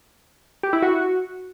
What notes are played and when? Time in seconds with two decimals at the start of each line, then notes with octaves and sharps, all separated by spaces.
0.63 G4
0.73 E4
0.82 F#4